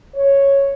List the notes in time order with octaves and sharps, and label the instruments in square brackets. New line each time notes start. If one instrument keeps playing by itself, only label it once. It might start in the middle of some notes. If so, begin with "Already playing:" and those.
[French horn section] C#5